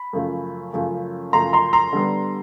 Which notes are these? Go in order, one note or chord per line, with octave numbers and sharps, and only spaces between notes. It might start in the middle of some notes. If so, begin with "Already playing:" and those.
Already playing: B5
F#2 C#3 F3 A3
F#2 C#3 F3 A3
F#2 C#3 F3 A3 A#5 C6
A#5 C6
A#5 C6
D3 G3 B3